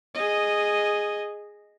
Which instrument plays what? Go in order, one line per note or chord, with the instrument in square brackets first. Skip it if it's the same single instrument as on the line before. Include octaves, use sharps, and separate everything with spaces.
[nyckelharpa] G#4 D#5